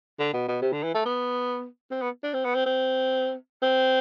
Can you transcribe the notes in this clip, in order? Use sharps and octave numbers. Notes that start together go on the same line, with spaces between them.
D3
B2
B2
C3
D3
E3
A3
B3
C4
B3
D4
C4
B3
C4
C4
C4